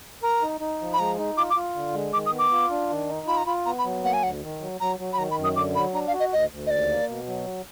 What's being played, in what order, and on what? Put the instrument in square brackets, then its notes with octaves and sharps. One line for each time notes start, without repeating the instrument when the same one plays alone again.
[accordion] A#4 [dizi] A#5
[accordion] D#4
D#4
F3
[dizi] B5
[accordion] G#3 [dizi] A#5
[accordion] D#4
[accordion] F4 [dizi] D6
[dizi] D6
[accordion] F4
D3
G#3
[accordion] D#3 [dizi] D6
[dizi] D#6
[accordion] B3
[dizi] D6
[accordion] F4
D4
D#3
D#4
[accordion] F4 [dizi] B5
[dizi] A#5
[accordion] F4 [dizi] B5
[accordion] B3 [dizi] A#5
[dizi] B5
[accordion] F#3
[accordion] A#3 [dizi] F#5
[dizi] G#5
[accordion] D2 [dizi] F#5
[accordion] D#3
F#3
[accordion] F#3 [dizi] A#5
[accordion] F#3
[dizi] B5
[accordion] D#3 [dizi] A#5
[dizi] B5
[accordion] F#2
[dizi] D#6
[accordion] D3 [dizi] D6
[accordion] F#3 [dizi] B5
[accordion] D4 [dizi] A#5
[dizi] F5
[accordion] F#4
[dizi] D#5
[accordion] D2 [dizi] D#5
[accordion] D2
[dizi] D#5
[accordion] D#2 [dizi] D5
[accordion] A#3
B2
F#3